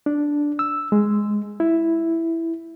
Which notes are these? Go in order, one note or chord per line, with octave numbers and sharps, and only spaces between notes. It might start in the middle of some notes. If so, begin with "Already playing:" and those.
D4
E6
G#3
E4